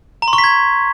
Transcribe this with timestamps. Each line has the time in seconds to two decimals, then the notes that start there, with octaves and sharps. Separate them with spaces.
0.22 A#5
0.28 C6
0.33 C#6
0.38 B6
0.44 G#6